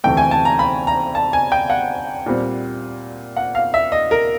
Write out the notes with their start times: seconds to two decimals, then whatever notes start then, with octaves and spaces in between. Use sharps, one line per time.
0.04 D2 C3 E3 A3 G5
0.17 G#5
0.31 A5
0.45 A#5
0.59 B5
0.87 A#5
1.15 A5
1.33 G#5
1.52 G5
1.70 F#5
2.26 A#2 G3 C4
3.37 F#5
3.55 F5
3.74 E5
3.92 D#5
4.11 A#4